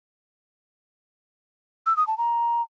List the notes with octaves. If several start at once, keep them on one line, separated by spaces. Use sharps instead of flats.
E6
D#6
A5
A#5